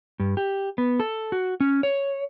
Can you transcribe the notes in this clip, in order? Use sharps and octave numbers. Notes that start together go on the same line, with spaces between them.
G2
G4
B3
A4
F#4
C#4
C#5